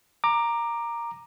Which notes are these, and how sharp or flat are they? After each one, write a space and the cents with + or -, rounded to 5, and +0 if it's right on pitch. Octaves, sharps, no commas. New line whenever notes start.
A#5 +0 D6 +20